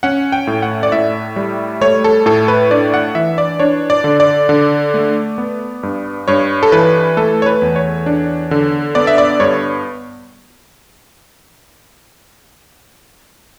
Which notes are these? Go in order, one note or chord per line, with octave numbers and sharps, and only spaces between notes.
C#4 F#5
G5
A2
F#5
D5
A2 E5
G3
A3 C#5
A4
A2 A4
B4
D4 D5
F#5
E3 E5
D5
D4 C#5
D5
D3
D5
D3
A3
B3
G2
G2 C#5
A4
E3 B4
A3 A4
C#5
B4
E2
C#5
D4
D3
B3 D5
E5
D5
G2 C#5